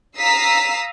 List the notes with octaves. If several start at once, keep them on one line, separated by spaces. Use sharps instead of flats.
F5 A#5 D#6 E6 B6 C7